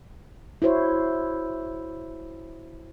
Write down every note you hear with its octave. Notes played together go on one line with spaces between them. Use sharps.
E4 F#4 C5 C#5